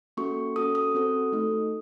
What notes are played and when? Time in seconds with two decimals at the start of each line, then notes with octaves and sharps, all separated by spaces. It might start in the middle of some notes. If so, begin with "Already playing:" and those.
0.17 A#3 C#4 F#4 A4 C#6
0.56 C#4 F#4 A4 D#6
0.75 D#6
0.95 C4 F#4 A4
1.32 A3 D#4 A4